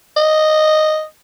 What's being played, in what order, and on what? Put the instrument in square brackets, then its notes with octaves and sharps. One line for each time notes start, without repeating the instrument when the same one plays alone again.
[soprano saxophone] D#5